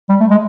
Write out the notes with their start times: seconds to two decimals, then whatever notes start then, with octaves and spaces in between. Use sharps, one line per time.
0.09 G3
0.20 A3
0.30 G#3